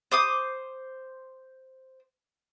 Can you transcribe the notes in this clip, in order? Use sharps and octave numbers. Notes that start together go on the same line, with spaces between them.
C5 D6 D#6